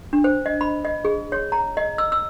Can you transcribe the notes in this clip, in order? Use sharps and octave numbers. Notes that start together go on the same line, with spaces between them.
D4
C5
D#5
B5
D#5
G#4
C#5
A#5
D#5
E6
E6